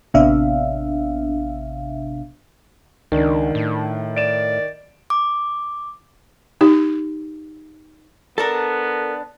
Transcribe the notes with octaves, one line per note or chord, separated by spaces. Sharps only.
A1 C3 B3 D4 E5 F5
C#2 D#3 D4
A2
D5 D7 E7
D6
D#4 G4
B3 D4 A4 A#4 A5